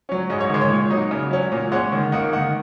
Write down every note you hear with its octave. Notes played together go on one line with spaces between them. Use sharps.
F#3 C#4
G#2 D#5
C#5
D#3 G#3
C#5
A#2
F#3 D#4
C#3
F#3 C#4
A#2
G#3 C#4 F#5
D#3
A#3 D#4 F#5
D#3 F#5